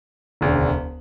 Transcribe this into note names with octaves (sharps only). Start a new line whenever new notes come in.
E1 D2 C#3